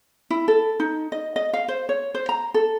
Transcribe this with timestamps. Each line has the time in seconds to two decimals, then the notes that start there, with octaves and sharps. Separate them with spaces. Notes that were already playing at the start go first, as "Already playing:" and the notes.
0.30 E4
0.48 A4
0.80 D#4
1.12 D#5
1.36 D#5
1.53 F5
1.68 C5
1.89 C#5
2.14 C5
2.29 A#5
2.54 A4